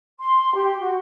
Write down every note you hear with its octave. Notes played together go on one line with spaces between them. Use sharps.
C6
G4
F#4